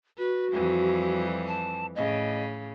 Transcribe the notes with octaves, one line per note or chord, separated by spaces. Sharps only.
F#4 B4
F2 E3 G3
A5
A2 C#3 D#5